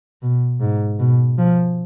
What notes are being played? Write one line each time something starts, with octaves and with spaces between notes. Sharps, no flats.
B2
G#2
B2
F3